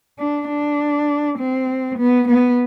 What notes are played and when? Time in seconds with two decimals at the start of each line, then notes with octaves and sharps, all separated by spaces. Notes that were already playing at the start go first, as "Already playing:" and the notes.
0.19 D4
0.49 D4
1.39 C4
1.98 B3
2.28 B3